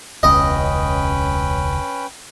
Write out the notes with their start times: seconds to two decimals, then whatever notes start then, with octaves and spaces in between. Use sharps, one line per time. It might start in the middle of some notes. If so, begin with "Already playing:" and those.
0.23 E1 C#2 C#4 B4 D#5 G5